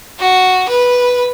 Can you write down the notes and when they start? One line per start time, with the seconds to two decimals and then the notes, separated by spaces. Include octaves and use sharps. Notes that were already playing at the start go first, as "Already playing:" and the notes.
0.19 F#4
0.69 B4